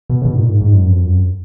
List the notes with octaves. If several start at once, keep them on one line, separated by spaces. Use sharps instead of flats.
B2
C#3
B2
G#2
A#2
G#2
G#2
F#2
F2
F#2